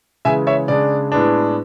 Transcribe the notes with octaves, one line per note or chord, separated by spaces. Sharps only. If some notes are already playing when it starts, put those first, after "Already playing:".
C#3 E3 G#3 E5 G#5
C#5 E5
C#3 G#3 D4 D5
A2 G#3 B3 D4